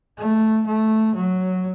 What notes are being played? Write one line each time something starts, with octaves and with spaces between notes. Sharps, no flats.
A3
A3
F#3